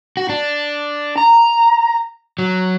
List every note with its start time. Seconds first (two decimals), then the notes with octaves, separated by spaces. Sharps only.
0.17 F#4
0.29 D4
1.18 A#5
2.39 F#3